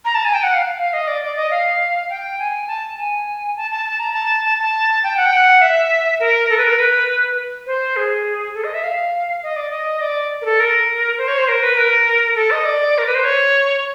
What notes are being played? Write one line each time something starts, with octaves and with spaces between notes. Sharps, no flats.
A#5
A5
G#5
G5
F#5
F5
F5
D#5
D5
D5
D#5
F5
G5
G#5
A5
G#5
A5
A5
A5
A#5
A5
A5
A5
G5
F#5
G5
F#5
E5
A#4
A4
B4
A#4
B4
C5
G#4
A4
D#5
E5
F5
D#5
D5
D#5
D5
A#4
A4
A#4
C5
C#5
C5
A#4
B4
A#4
A4
D#5
D5
A#4
B4
C5
C#5